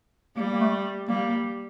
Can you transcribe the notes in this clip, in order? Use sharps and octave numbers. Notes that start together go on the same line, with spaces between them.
G3 A#3
A#3
A3
G3 A#3